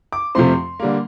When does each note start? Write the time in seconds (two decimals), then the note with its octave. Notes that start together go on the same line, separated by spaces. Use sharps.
0.12 D6
0.35 F2 C3 F3 A3 C4 C6
0.80 D3 G3 A#3